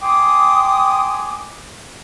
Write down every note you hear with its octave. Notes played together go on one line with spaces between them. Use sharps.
G5 G#5 C6 D6 D#6